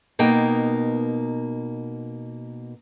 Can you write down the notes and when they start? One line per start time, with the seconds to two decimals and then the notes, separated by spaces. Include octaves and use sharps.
0.19 B2 A#3 D#4 G5